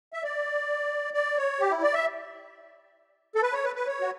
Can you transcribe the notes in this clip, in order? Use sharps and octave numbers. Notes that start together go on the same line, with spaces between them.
E5
D5
D5
C#5
G4
E4
D5
E5
A4
B4
C#5
B4
B4
C#5
F#4